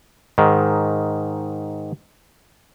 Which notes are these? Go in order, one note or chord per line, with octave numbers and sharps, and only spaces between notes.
G#2 D#3